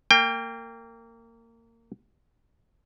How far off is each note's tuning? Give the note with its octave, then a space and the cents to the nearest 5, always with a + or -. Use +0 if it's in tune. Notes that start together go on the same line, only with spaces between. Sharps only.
A#3 -25 G5 +20